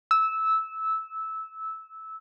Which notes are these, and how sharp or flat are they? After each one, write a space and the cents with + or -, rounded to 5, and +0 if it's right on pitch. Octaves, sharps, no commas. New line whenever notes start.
E6 -15